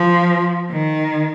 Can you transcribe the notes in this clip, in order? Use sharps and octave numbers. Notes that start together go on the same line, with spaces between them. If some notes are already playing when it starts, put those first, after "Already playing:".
Already playing: F3
D#3